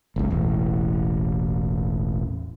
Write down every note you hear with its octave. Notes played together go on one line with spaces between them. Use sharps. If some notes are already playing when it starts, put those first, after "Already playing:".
F#1 C#2
E1 A1